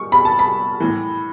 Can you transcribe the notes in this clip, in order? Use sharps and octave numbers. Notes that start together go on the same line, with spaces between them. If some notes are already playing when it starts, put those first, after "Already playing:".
Already playing: C#6
B5
A5
B5
A2 E3